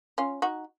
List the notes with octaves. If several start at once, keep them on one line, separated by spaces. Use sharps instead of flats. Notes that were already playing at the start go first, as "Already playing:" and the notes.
C#4 F4
D#4 F#4